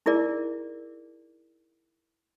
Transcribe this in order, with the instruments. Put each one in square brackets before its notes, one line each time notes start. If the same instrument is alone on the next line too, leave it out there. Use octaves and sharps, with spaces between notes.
[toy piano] D#4 E4 G#4 A#4 D5